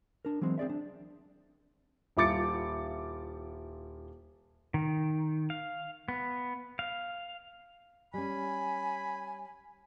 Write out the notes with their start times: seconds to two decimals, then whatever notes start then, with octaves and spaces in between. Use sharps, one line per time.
0.25 D4 A#4
0.41 E3 F#3 G#3 C4
0.58 C4 G#4 D5 E5
0.70 D4
2.17 D#1 E4 F4 D6 A6 C#7
4.74 D#3
5.50 F5
6.08 B3
6.79 F5
8.14 G3 C#4 G#5 B5